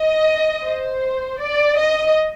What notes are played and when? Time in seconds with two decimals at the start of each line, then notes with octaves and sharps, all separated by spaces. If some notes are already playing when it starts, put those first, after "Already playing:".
Already playing: D#5
0.65 C5
1.41 D5
1.79 D#5